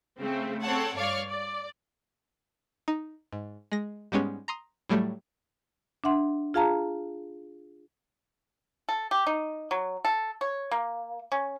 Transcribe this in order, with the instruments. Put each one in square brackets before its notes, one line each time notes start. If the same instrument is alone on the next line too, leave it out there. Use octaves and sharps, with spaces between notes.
[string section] C#3 A3 C4
C4 A4 C#5 F#5 A5
G2 C#5 D5 F5 C#6 F6
D5
[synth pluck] D#4
G#2
G#3 A#6
G#2 G3 G#3 B3 C#4
A#5 C6 D#6
A2 F#3 G3 A3
[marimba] D4 E5 F#5 C6
F4 G#4 F5 A5 A#5
[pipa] A4
G4
D#4
F#3
A4
C#5
A#3
C#4